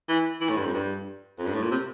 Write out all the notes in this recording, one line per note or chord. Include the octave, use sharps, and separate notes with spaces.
E3
E3
A2
G2
F2
G2
F2
G2
A2
A#2
C3